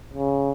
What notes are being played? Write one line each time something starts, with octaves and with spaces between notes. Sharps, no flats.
C#3